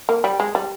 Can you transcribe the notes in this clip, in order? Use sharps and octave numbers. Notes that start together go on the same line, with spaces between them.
A#3
G3
G#3
G3